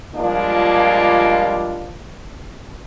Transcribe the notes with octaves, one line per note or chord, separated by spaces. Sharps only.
F3 G3 G#3 A#3 D4 F4